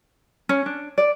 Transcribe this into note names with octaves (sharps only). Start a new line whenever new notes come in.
C#4
D4
D5